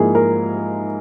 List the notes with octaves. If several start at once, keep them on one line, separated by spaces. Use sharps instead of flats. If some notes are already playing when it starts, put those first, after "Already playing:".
Already playing: G#2 F3 A#3 E4 G#4
A#4